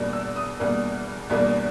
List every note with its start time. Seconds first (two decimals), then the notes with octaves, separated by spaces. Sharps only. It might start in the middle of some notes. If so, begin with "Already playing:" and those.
Already playing: E2 B2 G3 A#3 D4
0.13 E6
0.36 D#6
0.59 E2 B2 G3 A#3 D4
1.30 E2 B2 G3 A#3 D4